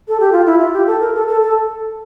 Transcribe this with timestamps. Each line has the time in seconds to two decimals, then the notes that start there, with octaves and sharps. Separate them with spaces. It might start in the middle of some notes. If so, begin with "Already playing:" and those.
0.08 A4
0.20 G4
0.32 F4
0.46 E4
0.60 F4
0.73 G4
0.87 A4
1.00 A#4
1.15 A4
1.28 A4
1.42 A4